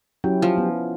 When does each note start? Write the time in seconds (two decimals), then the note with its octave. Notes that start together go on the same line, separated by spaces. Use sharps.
0.24 F#3 C#4 E4 G4
0.42 F3
0.58 B3